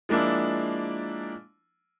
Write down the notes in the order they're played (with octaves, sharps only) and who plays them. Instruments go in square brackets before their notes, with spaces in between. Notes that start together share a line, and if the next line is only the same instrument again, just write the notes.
[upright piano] F3 G#3 A#3 D4 E4